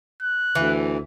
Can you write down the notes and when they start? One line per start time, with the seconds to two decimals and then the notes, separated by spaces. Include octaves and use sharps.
0.22 F#6
0.55 D2 E3